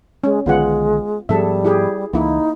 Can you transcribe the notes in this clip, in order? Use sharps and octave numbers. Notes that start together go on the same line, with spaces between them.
G#3 C#4
B1 D3 D#3 G#3 B3 F4 F#5
G#2 F3 G3 B3 G#4 A4 E5
E4 G4 G#4
C#2 E3 A#3 D#4 E4